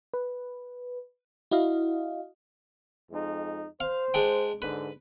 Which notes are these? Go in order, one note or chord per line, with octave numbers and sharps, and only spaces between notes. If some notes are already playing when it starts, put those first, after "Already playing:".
B4
E4 F#4 D#5 F5
F2 G#3 D#4
C5 F5
G#3 D4 G5
G#2 D3 B4